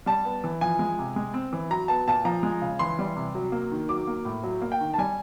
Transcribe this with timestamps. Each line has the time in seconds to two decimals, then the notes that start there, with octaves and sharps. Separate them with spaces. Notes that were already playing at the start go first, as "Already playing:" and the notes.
0.06 G3 A5
0.25 B3
0.44 E3
0.61 F3 G#5
0.79 G#3
0.98 C3
1.16 G#3
1.34 C4
1.53 E3
1.70 F#3 A#5
1.88 B3 A5
2.08 A#2 A5
2.25 F3 A#5
2.43 G#3
2.62 C#3
2.79 E3 C6
2.99 G3
3.16 C3
3.35 F#3
3.52 A#3
3.72 D#3
3.89 F#3 D6
4.07 A#3
4.25 A2
4.44 F#3
4.62 A#3
4.72 G5
4.81 D#3
4.94 A5
4.98 G3 G#5